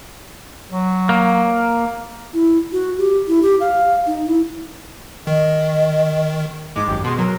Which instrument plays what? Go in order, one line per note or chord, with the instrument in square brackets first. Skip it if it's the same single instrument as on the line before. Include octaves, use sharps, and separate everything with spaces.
[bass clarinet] F#3
[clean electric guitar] A#3
[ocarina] E4
F#4
G4
E4
G4
F5
D#4
E4
[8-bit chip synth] D#3 [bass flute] D#5
[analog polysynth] G#2 G#3 [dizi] D6
[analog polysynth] G#1 F#2 [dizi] G4
[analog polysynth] B2 G#3 [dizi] C6
[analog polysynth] F#3 [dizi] A#4